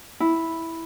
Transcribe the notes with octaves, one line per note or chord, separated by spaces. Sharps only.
E4